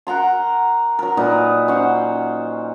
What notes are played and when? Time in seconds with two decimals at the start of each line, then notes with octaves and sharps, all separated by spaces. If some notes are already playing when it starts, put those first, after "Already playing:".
0.07 A#4 F#5 A#5 C6
0.99 F#3 A#4
1.17 A#2 D#4 B4 D#5
1.68 C#4 C5 F#5